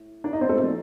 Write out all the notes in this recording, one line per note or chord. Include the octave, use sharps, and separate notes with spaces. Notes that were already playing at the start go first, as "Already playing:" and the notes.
Already playing: A2
D4 D5
D#4 D#5
C4 C5
A3 A4
A#2 F3